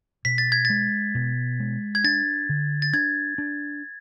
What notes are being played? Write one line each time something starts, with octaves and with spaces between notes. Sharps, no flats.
B2 B6
A6
G#6
G#3 A6
B2
G#3
G#6
D4 A6
D3
A6
D4 G#6
D4